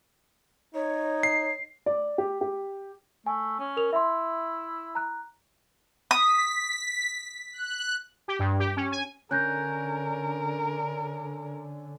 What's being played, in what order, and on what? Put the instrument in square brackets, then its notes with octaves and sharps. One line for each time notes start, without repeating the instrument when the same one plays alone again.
[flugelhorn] D#4 [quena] C#5
[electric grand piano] C7
[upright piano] D5
G4
G4
[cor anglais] A3 [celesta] G#5
[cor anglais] C#4
[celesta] A#4 F7
[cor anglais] E4 [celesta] E5 C6
[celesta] A#5 F#6
[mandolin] D#6 [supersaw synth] B6
[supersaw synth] F#6
[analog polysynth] G4
G2
G4
C#4
G#5
[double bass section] D3 [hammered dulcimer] C#4 [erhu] A#4 [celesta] F#6 G6 A#6